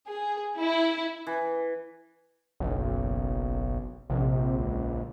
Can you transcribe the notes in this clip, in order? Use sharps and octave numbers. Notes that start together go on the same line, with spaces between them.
G#4
E4
E3
F#1 B1
A#1 C3
C#2